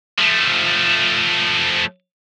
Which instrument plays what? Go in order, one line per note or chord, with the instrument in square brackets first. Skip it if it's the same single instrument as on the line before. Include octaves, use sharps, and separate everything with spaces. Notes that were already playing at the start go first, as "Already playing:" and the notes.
[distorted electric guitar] F3 A3